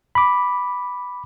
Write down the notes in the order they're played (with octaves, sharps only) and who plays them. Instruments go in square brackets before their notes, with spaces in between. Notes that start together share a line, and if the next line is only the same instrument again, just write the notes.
[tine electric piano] B5 D6